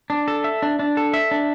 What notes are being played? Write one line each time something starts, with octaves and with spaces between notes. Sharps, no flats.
D4
A4
E5
D4
D4
A4
E5
D4